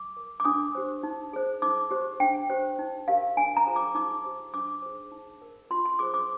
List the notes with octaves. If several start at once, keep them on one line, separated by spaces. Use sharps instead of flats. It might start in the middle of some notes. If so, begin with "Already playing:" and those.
Already playing: D6
A#4
D6
D4 D#6
G4 C5
D#4
G#4 C5
D#4 D6
G4 C5
D4 G5
G4 C5
D#4
G4 A#4 F5
D4 G#5
A#5
F4 G#4 C5
D6
D#4 D6
G4 C5
D4 D6
G#4 C5
D#4
A#4
F4 C6
C6
G#4 C5 D6
D6